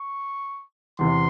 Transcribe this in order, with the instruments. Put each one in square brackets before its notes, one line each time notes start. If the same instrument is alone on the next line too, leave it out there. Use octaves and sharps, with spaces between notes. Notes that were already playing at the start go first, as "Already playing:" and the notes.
Already playing: [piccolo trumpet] C#6
[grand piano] E2 C3 E3 [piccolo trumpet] C6